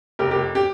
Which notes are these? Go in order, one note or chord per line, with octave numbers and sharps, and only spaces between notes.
F1 G4 A#4
F1 G4
G4